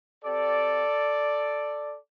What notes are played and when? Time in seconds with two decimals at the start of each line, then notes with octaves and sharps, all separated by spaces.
0.24 C4 G4 A4 D5